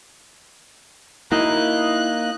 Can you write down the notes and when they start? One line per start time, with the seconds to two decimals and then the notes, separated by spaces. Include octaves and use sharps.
1.32 A#3 D#4 E4 F#4 F5 F#6